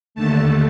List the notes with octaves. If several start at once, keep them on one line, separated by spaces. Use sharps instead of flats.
D#2 D3 A3 A5